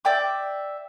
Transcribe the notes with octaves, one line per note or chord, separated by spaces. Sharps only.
D5 E5 G5 D6